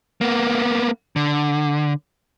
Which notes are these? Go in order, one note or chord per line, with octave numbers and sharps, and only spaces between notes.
A#3 B3
D3